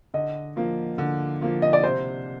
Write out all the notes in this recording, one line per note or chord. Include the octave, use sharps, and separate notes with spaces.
D3 D#5
F3 A#3 F4
D3
F3 A#3 F4
D#5
D5
C3 C5